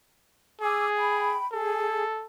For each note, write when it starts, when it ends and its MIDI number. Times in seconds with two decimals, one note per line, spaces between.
0.61 1.38 68
0.61 0.87 80
0.61 0.87 86
0.61 0.87 88
0.96 1.46 79
0.96 1.46 83
1.52 2.04 68
1.52 2.26 69